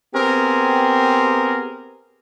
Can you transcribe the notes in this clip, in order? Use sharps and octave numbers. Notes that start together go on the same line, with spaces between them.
B3 C4 G4 G#4 A#4